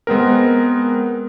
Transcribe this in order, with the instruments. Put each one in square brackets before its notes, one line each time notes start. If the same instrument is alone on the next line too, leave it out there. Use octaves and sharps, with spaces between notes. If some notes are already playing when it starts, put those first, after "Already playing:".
[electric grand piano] G#3 B3 C4 A#4